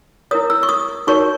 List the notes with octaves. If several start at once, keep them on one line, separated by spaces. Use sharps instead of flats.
E4 A#4 C#5 D#6
E6
C#6
D#6
D#4 F#4 A#4 C#5 C#6